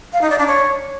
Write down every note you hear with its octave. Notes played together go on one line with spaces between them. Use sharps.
F5
D#4
D5
D4
C#5